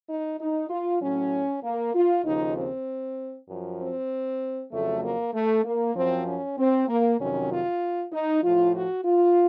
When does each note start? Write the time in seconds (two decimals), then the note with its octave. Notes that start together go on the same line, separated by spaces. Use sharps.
0.09 D#4
0.40 D#4
0.70 F4
1.01 A2 F#3 C#4
1.63 A#3
1.94 F4
2.25 D#2 C#3 F3 D#4
2.56 C4
3.49 F#2 F3
3.80 C4
4.72 F2 C#3 F#3 A3
5.03 A#3
5.34 A3
5.65 A#3
5.95 F#2 F3 C4
6.26 C#4
6.58 C4
6.88 A#3
7.19 F2 C3 D#3 F#3 C#4
7.50 F4
8.12 D#4
8.43 A2 F3 F4
8.74 F#4
9.05 F4